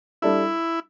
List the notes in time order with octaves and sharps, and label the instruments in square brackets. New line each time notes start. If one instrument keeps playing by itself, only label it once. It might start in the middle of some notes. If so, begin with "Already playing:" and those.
[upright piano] G3 D4 A4 E5 [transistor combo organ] E4